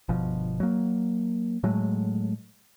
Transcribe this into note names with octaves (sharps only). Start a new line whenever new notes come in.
G1 B2 F3
F#3 A#3
A2 F#3 G#3 A3